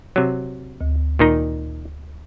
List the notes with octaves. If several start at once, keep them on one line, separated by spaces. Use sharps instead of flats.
C3 F#3
D2
A#2 D#3 D#4